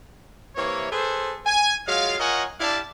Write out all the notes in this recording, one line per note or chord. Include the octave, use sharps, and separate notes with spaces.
C3 E3 A#3 C#5
G#4 A4 B4 C5
G#5
F#3 G#3 F4 F5
F4 A#4 C#5 D#5 F#5 G#5
D4 E4 G4 D5 F5 A5